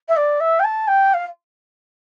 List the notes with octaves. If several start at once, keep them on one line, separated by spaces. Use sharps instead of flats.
E5
D5
E5
G5
A5
G5
F5